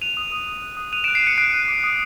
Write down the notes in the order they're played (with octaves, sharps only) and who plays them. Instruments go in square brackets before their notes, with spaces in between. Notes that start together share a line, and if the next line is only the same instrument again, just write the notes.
[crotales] F#6 D#7 F7
D#6
D#6
D#6
F#6
D#6
F#6 D#7 F7
D7 E7
F#6
C7 D7
F#6 C#7 D#7
F#6 C7 D7
F#6
D6
D#6